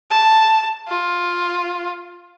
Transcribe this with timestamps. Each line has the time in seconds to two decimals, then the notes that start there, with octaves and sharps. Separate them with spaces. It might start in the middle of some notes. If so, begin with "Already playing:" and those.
0.10 A5
0.88 F4